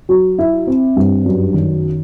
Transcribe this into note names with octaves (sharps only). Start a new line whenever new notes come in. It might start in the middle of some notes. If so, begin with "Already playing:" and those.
F#3
E4
C4
G2
F#2
D#3